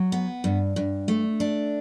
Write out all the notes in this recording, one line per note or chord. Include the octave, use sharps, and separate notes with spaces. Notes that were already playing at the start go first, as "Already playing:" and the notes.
Already playing: F#3
B3
G2
G2
A3
D4